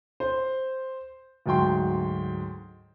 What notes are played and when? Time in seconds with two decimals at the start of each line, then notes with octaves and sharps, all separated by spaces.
0.20 C5
1.46 D2 G#2 F#3 G5 C6